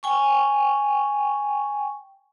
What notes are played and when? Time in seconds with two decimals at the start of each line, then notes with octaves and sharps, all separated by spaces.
0.03 G5 G#5 C#6